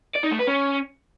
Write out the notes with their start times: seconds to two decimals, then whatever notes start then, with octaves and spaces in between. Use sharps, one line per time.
0.16 D5
0.24 D#4
0.32 A3
0.40 B4
0.48 C#4